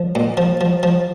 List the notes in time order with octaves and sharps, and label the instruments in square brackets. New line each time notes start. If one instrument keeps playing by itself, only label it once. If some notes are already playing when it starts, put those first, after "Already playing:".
Already playing: [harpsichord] F3
A#2
F3
F3
F3